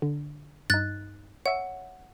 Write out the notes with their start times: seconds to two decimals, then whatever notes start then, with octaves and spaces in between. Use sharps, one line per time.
0.02 D3
0.70 G2 D#4 F#6 A6
1.46 C#5 E5 F#5